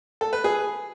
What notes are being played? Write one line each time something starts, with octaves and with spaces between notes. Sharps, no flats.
A4
B4
G#4